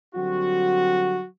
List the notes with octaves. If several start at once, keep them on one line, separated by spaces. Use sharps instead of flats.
D3 F#3 G3 C4 F#4